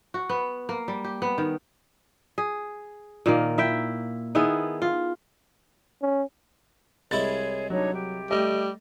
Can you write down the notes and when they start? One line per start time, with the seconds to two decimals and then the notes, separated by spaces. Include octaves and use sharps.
0.14 F#4
0.29 B3
0.69 A#3
0.88 G3
1.04 G4
1.22 B3
1.38 D#3
2.38 G#4
3.26 A#2 D#3 A#3
3.58 E4 E5 G5
4.35 D#3 B3 E4 G#4
4.82 F4
6.02 C#4
7.11 C2 G#3 E4 G#4 C#5 A6
7.70 F#3 D4 D#4 C#5
7.94 G4
8.30 G3 A3 D#5